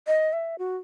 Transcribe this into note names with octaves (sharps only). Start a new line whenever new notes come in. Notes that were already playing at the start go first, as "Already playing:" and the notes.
D#5
E5
F#4